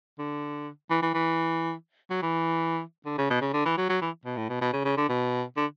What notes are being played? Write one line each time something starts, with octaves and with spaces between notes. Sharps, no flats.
D3
E3
E3
E3
F#3
E3
D3
C#3
B2
C#3
D3
E3
F#3
F#3
E3
B2
A2
B2
B2
C#3
C#3
D3
B2
D3